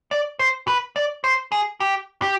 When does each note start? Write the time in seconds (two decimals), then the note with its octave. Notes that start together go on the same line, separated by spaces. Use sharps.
0.11 D5
0.39 C5
0.68 B4
0.96 D5
1.24 C5
1.52 G#4
1.80 G4
2.22 G4